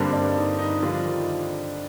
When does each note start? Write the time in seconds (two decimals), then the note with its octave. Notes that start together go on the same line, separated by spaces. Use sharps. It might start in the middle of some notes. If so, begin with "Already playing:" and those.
Already playing: G2 D3 G3 A#3 C4
0.12 D4
0.36 D#4
0.59 D#4
0.82 D3 F3 G3 D4 F4
1.05 D#3